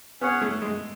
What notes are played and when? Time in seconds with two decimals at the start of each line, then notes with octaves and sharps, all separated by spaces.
0.21 B3 C#4 G#4 C#5 F#5
0.41 A3
0.62 G#3